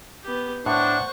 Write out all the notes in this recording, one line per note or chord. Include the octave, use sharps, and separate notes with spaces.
B3 G4
A2 D4 C5 F#5 C#6